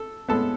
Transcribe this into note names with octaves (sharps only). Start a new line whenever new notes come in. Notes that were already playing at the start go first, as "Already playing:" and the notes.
Already playing: A4
A2 G#3 B3 A4 A5